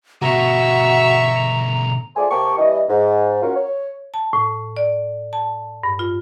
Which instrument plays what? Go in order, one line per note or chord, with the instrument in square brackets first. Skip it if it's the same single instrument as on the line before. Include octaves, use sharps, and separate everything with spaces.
[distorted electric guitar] B2 D3 [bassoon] F#4 [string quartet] E5 C#6 [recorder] A#5
[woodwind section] A3 F4 G#4 C5 D5 G#5
C3 A#3 G4 G5 A5 C#6
G2 E3 D#5
G#2
C#4 F4 F#4 A#4
C#5
[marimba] A5
A2
D5
A5
G2
F4